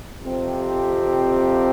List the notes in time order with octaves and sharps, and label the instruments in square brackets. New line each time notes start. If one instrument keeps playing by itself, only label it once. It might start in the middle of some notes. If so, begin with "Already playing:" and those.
[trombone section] F2 C3 F3 C4 G4